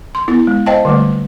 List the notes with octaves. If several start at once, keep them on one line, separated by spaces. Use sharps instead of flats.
C6
B3 E4
G#3
C5 D#5 F5 G5 A5
D3 G3 A3